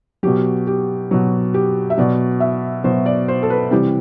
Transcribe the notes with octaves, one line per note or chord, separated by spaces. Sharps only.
B2 F#3 G4
G4
B2 F#3
G4
E5
B2 F#3 D5
E5
B2 F#3 C5
D5
C5
A4
B4
C3 E3 G3 G4